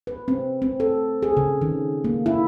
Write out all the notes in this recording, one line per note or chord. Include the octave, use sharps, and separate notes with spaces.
B4
C4
C4
A4
G#4
C#3
D#3
A#3
E4